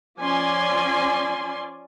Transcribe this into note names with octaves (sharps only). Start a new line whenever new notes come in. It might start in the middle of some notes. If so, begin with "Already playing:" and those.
F3 C#4 D5 G#5 C6